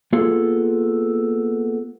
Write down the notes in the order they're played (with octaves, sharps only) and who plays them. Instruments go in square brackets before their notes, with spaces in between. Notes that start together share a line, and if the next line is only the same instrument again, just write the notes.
[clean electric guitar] A#3 B3 F4 G#4 A4